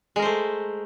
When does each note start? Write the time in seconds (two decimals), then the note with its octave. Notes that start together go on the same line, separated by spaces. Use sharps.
0.16 G#3
0.19 A#4
0.22 C5
0.25 A3